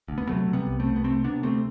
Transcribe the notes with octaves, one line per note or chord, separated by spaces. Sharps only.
D2
B3
C3 F#3 A3
C3
G3 B3
C2
A3 C4
C2
B3
C3 A3 C4
C3 B3 D4
D2 A3 C4